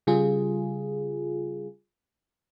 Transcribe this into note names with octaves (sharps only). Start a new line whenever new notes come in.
C#3 G3 F4 G#4